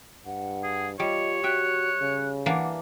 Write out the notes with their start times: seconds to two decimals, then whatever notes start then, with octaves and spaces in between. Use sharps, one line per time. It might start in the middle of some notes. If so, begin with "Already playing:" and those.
0.25 G2 F#5
0.63 G#4
1.00 G3 F4 C#5 D#5
1.44 F#4 E5 G5 F#6
2.01 C#3
2.46 E3 A#3 D4 F#5